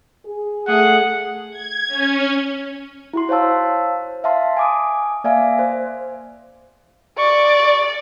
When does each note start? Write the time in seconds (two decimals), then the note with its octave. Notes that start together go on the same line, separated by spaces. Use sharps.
0.24 G#4
0.68 A3 G#4 F#5
1.51 G#6
1.88 C#4
3.14 E4 F#4 C6
3.29 C5 C#5 F5 A5 E6
4.24 E5 F5 A5 C6
4.57 G#5 D6 D#6
5.24 A#3 D5 E5 F5 G#5
5.59 C5
7.19 D5 C#6